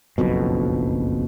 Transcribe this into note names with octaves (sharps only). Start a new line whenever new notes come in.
F#1 B1 F2 B2